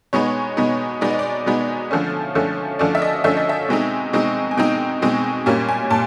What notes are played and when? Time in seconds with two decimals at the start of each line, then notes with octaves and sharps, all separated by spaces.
0.13 B2 G#3 B3 D#4 C#5
0.57 B2 G#3 B3 D#4
1.01 B2 G#3 B3 D#4 D5
1.11 D#5
1.19 D5
1.46 B2 G#3 B3 D#4
1.91 D3 F3 A3 C#4
2.35 D3 F3 A3 C#4
2.79 D3 F3 A3 C#4 D5
2.95 E5
3.02 D#5
3.24 D3 F3 A3 C#4 E5
3.37 D#5
3.49 E5
3.68 B2 G#3 C4 D#4
4.13 B2 G#3 C4 D#4
4.51 G#5
4.57 B2 G#3 C4 D#4 G5
5.02 B2 G#3 C4 D#4
5.46 A#2 G3 A#3 C#4 G#5
5.69 G#5
5.90 A#2 A5